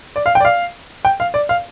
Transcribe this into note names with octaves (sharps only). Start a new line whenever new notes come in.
D5
F5
G5
D5
F5
G5
F5
D5
F5